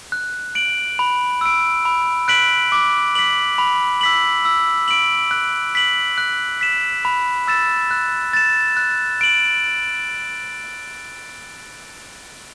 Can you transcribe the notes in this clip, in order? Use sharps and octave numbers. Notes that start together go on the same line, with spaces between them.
F#6
D7 F#7
B5
E6 D7
B5
F#6 B6 D7 F#7
D6
B6 F#7
B5
E6 B6 F#7
E6
D7 F#7
F#6
B6 F#7
F#6
B6 E7
B5
E6 A6 E7
F#6
A6 E7
F#6
D7 F#7